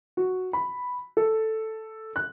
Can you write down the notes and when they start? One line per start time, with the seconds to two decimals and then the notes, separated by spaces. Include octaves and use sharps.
0.17 F#4
0.53 B5
1.17 A4
2.16 F#6